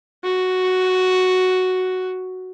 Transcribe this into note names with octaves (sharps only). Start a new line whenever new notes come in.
F#4